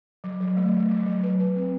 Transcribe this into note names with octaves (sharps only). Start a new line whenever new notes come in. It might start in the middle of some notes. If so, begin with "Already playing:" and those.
F#3
F#3
A3
A3
F#3
F#3
B4
B4
C4